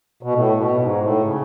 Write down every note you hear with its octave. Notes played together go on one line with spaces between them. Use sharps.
B2
A2
B2
G#2
A2
C#3